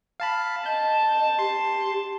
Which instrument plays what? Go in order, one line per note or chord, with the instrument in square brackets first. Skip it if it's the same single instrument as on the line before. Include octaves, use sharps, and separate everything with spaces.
[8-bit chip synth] F5 A5 B5
[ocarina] D#5 [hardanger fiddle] A5 [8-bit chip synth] G6
[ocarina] G4 [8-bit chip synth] C6